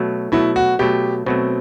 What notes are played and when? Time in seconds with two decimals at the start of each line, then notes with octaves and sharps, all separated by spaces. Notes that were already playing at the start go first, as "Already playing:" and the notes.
Already playing: B2 F#3 A3
0.32 B2 F#3 A3 E4
0.56 F#4
0.79 B2 F#3 A3 G4
1.26 B2 F#3 A3 C4